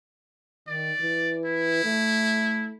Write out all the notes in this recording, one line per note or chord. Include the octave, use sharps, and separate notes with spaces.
D#3 D5
E3
E4
A3